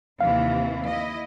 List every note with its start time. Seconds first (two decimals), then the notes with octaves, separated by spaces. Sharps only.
0.20 D#2 C3 E3 F5
0.88 E4 D#5